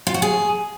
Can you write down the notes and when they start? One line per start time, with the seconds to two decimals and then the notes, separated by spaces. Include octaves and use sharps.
0.07 F4
0.14 F#4
0.22 G#4